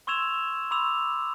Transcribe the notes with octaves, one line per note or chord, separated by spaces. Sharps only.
C6 C#6 E6 G#6 E7 F7
B5 C6 D6 E6 F7